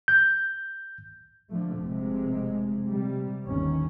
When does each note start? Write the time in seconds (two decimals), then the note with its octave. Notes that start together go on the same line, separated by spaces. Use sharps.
0.08 G6
1.50 D3 F3 A3
1.81 F1 C3 G#3
2.90 C3 G3
3.46 G1 D#2 D#3 C#4